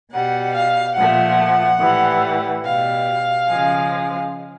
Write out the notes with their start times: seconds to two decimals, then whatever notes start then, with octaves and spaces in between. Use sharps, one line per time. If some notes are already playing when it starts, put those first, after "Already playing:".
0.12 B2 G3 F#5
0.54 F5
0.96 A#2 F3 A3 F#5
1.80 A2 E3 G3
2.64 B2 G3 F5
3.48 C#3 F3 G#3